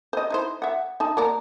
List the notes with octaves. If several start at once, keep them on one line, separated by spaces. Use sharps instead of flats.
C5 D#5
D#4 E4 C5
E5 F#5
D#4 A5
A#3 A#4 D5